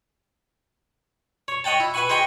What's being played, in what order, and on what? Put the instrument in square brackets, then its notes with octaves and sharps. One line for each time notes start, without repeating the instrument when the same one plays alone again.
[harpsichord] C#5
C#5 D#5 F#5 G5 A5
E4
B4 E5 F#5 G#5 C#6
G#4 C5 D#5 G5 C#6